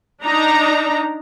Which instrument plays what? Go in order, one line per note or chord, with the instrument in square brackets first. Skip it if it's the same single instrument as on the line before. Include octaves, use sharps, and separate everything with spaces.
[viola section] D4 D#4 A#5